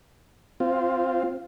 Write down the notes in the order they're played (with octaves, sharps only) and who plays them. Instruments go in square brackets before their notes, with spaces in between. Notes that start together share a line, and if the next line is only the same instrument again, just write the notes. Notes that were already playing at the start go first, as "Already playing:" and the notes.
[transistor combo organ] C4 F4